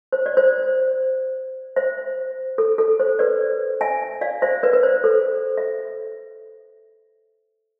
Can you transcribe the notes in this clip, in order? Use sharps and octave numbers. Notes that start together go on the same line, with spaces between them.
C5
D5
C5
C5 E5
A4
A4
C5
B4 D5
E5 G#5
D5 F5
C5 E5
B4 D5
B4
C5
A4
E5